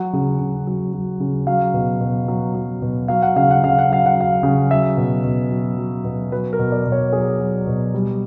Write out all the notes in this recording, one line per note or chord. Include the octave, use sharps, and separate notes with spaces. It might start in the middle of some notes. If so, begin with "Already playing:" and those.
Already playing: F#3 F#5
C#3
C#3
F#3
F#3
C#3
F#3 F5
B2
B2
F#3
F#3
B2
F#3 F5
F#5
C#3 F5
F#5
C#3 F5
F#5
F#3 F5
F#5
F#3 F5
C#3
F#3 E5
B2
B2
F#3
F#3
B2
F#3 B4
A#4
B2
D5
B2
C#5
F#3 G#4
F#3
B2
G3